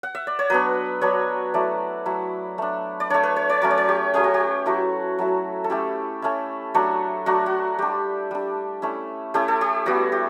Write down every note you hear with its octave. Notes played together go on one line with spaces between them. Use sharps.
F#5
E5
D5
C#5
F#3 B3 D4 B4
F#3 B3 D4 C#5
F#3 A3 E4 D5
F#3 A3 E4
A3 D4
D5
A3 D4 C#5
B4
C#5
C#5
F#3 A3 C#4 C#5
D5
C#5
G4
F#3 A3 C#4 G4
F#4
G4
F#3 A3 E4 F#4
F#3 A3 E4
A4
A3 C#4 E4 G4
A3 C#4 E4
F#3 A3 D4
F#3 A3 D4 F#4
F#4
G3 D4 G4
G3 D4
A3 C#4 E4
A3 C#4 E4 G4
A4
G4
G3 B3 E4 F#4
G4